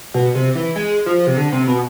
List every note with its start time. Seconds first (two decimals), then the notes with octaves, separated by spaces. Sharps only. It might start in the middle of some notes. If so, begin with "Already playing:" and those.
0.14 B2
0.35 C3
0.55 E3
0.76 G#3
1.06 F3
1.27 C3
1.37 D3
1.52 C3
1.67 B2